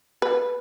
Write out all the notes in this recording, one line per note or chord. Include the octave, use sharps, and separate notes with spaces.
B4